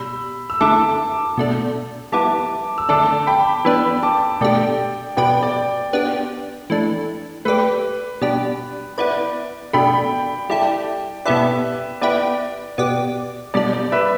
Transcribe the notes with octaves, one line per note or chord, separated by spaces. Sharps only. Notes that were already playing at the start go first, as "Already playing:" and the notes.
Already playing: B2 G3 B5 E6
E6
D3 A3 E4 A5 D6
B2 A3 D4
G3 B3 E4 A5 D6
E6
D3 A3 D4 A5 D6
G5 B5
E3 B3 D4 B5 E6
A5 D6
B2 A3 D4 G4 D5 G5
B2 B3 G4 B4 D5 G5
D5
B3 D4 G4
E3 A3 D4
A3 G4 B4 D5
B2 G3 D4 G4
B3 E4 B4 D5
B2 A3 D4 G5 B5
G3 E4 A4 D5 G5
B2 G3 E4 A4 B4 D5 E5
B3 E4 G4 B4 D5
B2 B3 G4 D5
B2 G3 D4 D5
D5
B4 E5